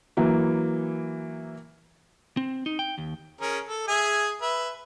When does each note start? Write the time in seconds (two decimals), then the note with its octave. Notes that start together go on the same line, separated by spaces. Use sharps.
0.17 E3 F#3 A#3 E4
2.37 C4
2.66 D#4
2.79 G5
2.98 D#2
3.41 C#4 G#4 A#4
3.68 A4
3.88 G#4 E5 G#5
4.42 B4 E5